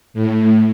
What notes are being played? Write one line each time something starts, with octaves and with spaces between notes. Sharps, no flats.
A2